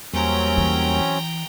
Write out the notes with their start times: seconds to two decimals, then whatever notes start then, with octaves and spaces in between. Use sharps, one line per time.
0.13 E2 F#3 G3 A#3 C4 C#4 G5 A#5
0.57 E3